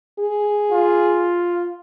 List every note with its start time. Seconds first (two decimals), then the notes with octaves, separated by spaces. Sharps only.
0.19 G#4
0.71 F4